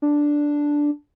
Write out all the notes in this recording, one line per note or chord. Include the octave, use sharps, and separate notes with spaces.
D4